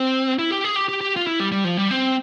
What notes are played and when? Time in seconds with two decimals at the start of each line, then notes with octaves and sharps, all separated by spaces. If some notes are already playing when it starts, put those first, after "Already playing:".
Already playing: C4
0.39 E4
0.51 G4
0.64 G#4
0.76 G4
0.89 G4
1.01 G4
1.16 F4
1.27 E4
1.40 G3
1.52 G3
1.64 F3
1.77 G3
1.91 C4